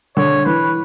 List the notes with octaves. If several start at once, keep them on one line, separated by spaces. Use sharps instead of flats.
D3 C#5
E3 B4